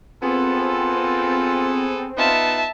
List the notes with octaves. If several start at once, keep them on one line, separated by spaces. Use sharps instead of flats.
B3 C4 F4 G#4 A4
B3 D#4 F4 E5 A5